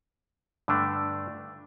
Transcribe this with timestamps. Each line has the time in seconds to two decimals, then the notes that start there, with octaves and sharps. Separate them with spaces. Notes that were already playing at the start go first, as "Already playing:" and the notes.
0.68 G2 D3 A3 D4